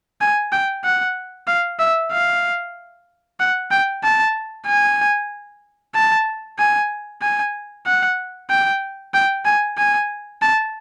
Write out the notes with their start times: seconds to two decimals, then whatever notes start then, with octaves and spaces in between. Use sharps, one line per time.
0.21 G#5
0.52 G5
0.84 F#5
1.48 F5
1.80 E5
2.12 F5
3.40 F#5
3.71 G5
4.03 A5
4.67 G#5
5.95 A5
6.59 G#5
7.22 G#5
7.86 F#5
8.50 G5
9.14 G5
9.45 G#5
9.78 G#5
10.42 A5